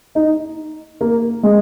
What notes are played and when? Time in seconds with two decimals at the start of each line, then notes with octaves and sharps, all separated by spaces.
0.15 D#4
1.01 A#3
1.43 G#3